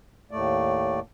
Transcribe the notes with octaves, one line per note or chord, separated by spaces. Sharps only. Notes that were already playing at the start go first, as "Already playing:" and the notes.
D#2 A2 A3 D5